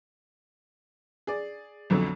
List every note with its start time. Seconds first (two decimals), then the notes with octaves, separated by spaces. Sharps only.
1.27 G#4 D5
1.90 B1 F2 D3 F#3